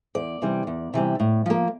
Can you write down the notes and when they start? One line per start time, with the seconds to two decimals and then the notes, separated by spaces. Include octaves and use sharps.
0.15 E2 D5
0.42 C3 E3 G3
0.67 E2
0.94 C3 E3 G3
1.20 A2
1.46 F3 A#3